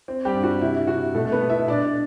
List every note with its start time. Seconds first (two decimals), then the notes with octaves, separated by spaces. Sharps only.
0.08 C4
0.25 G3 G4
0.34 G2
0.43 F#4
0.61 C3 E4
0.87 C3 F#4
1.15 B2 A3 A4
1.25 A4
1.32 B3 B4
1.41 B2
1.50 E4 E5
1.68 B2 D4 D5